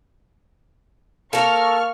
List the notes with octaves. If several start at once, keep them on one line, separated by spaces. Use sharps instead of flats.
A#3 A4 A#4 C#6 F6